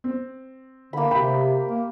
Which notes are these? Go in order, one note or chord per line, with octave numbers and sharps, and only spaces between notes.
C4
D3 A#3 B5
C3 G4 G5 B5
A#3